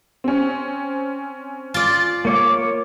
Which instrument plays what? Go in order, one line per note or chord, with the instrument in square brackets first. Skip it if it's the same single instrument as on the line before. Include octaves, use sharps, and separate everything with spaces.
[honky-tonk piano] C4 C#4
[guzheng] F4 D5
[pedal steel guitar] A#3 C#5 D6